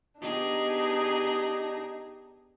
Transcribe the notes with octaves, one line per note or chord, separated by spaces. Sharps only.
B3 D4 D#4 G4 G#4